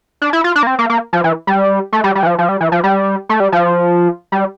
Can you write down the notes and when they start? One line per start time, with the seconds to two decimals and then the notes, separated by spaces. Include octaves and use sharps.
0.22 D4
0.33 E4
0.44 F4
0.56 D4
0.63 A#3
0.67 C4
0.79 A#3
0.90 A#3
1.13 F3
1.24 E3
1.47 G3
1.93 A3
2.04 G3
2.15 G3
2.23 E3
2.27 F3
2.38 F3
2.49 G3
2.61 E3
2.72 F3
2.84 G3
3.29 A3
3.40 G3
3.52 F3
4.32 G3